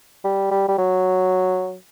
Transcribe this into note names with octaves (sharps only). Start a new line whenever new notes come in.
G3
G3
G3
F#3